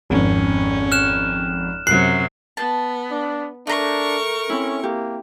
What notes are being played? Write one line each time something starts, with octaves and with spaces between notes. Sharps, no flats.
G#1 F2 C#4
F6 F#6 E7
F#2 C3 F#3 F#6 C7
B3 A5
D4
A3 D4 A#4 A#5 C#6
C4 C#4 E4
A#3 G4